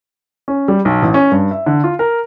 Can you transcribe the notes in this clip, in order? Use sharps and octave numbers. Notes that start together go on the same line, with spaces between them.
C#4
G3
B1
A1
C#4
G2
E5
D3
F4
A#4